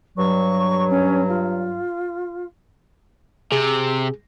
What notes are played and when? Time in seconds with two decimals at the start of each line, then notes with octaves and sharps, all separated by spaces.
0.17 G2 F#3 C#6
0.89 C#4
1.29 F4
3.52 C3 G#4